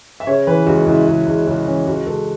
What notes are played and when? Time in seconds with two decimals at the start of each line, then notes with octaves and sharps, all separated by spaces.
0.20 E5
0.27 C#3 C#5
0.47 E3 B4
0.67 C#2 F#4
0.86 C#2 E4
1.07 C#2
1.27 C#2
1.47 C#2 C#4
1.66 E3 C#4
1.86 C#2 F#4
2.06 C#2 A4